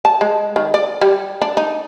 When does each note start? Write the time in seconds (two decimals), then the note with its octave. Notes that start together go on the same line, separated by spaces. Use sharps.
0.05 A5
0.21 G#3
0.56 D#3
0.74 D5
1.01 G3
1.41 D4
1.57 D#4